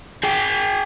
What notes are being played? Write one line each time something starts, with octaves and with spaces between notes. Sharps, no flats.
G#4 G5